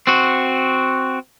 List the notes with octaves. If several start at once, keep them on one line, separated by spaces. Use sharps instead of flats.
C4 F#4